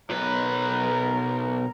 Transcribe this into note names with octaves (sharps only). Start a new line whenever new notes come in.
B1 A#4 B4